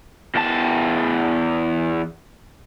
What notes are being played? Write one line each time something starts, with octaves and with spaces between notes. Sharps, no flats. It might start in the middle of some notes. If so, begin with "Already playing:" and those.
E2 A5